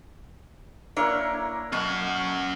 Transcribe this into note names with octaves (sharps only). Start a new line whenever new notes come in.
A#3 D4 E4 A#4 C#5
B2 C#4 F5 F#5